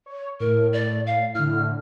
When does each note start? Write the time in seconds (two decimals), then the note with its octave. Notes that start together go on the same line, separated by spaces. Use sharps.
0.06 C#5
0.40 A2 A#4
0.73 D5
1.07 F5
1.35 A2 D3 F6